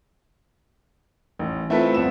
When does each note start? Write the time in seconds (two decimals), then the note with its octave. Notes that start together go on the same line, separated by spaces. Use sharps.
1.39 A1
1.70 A3 C4 E4 F4 A4 B4
1.94 G1 B3 C4 E7